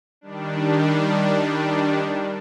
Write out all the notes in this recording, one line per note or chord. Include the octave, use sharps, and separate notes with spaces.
D#3 G3 D4